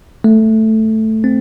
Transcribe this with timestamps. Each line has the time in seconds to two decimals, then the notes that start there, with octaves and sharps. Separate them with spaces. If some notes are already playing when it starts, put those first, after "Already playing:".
0.24 A3
1.24 C4